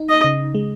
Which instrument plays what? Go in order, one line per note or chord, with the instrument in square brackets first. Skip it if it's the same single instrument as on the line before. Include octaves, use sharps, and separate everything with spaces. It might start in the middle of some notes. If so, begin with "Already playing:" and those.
Already playing: [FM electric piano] D#4
[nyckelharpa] D#5
[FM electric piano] C#3
G#3